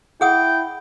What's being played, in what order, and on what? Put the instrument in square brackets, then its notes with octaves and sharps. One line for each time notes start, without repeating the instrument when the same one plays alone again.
[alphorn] E4 [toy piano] G#4 F#5 D#6 [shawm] G5